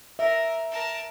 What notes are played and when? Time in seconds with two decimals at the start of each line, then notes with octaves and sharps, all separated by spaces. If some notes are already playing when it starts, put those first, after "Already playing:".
0.19 A#4 E5
0.71 A#4 A5